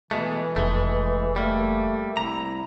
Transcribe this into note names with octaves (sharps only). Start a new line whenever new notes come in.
B2 E3 G#3 A3
F1 G#3 A3
G3 A3 A#3
C2 E4 A#5